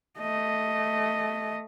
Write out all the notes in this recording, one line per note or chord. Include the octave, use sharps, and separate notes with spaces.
A3 D#5